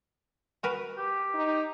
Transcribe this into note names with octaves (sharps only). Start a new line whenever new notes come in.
F#4 A#4 B4
G4
D#4